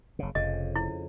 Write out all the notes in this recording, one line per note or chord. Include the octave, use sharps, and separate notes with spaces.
F#1 C#3
F1 F2 C#3 D#5
E4